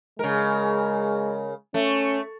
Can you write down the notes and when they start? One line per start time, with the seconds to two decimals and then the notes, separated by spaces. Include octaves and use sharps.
0.19 C#3 G#3 A#4
1.74 A3 C#4